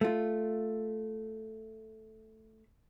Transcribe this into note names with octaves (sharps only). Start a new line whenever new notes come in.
A3 F4